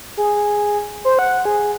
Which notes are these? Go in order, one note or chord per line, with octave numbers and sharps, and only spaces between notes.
G#4
C5
F#5
G#4